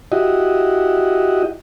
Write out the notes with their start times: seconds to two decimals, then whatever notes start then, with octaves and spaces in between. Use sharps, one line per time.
0.12 E4 F#4 G4 D#5